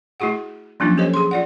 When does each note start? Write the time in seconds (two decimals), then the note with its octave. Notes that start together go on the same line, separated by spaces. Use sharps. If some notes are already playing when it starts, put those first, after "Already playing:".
0.20 A3 E4 F#4 G#4 F#5
0.80 F3 F#3 A#3 C#4 D4 F4
0.97 C#4 G4 A4 C5 C#5 D#5
1.14 G#4 C6
1.31 F4 D5 F#5